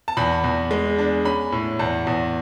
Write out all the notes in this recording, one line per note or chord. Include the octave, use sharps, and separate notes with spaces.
A5
E2 B5
E2
G#3
D4
C#4 B5
A2
E2 A5
E2